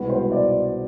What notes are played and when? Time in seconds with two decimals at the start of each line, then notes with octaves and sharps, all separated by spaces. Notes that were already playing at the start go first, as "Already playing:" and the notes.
Already playing: C2 B2 G#3 B3 B4
0.10 C5
0.32 D5